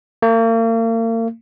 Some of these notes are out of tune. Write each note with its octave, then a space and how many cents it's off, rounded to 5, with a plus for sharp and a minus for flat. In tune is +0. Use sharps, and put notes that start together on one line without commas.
A#3 -40